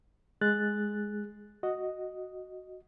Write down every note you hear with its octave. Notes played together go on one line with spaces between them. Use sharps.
G#3 G#4 F#6 A6
F#4 D#5